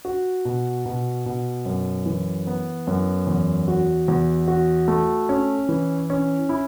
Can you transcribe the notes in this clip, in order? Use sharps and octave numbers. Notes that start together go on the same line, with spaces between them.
F#4
B2
B2
B2
F#2
E3
B3
F#2
E2
F#4
E2
F#4
A3
C#4
E3
C#4
E4